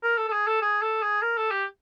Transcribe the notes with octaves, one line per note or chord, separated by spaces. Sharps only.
A#4
A4
A4
G#4
A4
G#4
A4
G#4
A#4
A4
G4